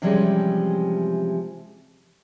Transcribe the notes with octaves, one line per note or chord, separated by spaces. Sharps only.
C3 E3 F3 G3 G#3 C#4